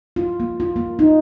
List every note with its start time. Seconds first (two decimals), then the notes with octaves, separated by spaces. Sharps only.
0.16 F4
0.40 A#3
0.60 F4
0.76 A#3
0.99 D#4